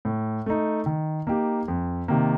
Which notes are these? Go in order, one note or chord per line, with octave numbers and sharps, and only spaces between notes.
A2
A3 D#4
D#3
A#3 D#4 G4
F2
C3 D#3 A#3